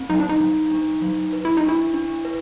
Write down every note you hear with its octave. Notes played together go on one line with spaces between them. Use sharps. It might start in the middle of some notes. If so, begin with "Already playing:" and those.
Already playing: C4
F#3 D#4
D4
D#4
F#3
D4
F#3
B4
E4
D#4
D4 E4
D4
B4